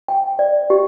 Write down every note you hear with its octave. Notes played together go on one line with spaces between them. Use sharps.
G5
D5
G4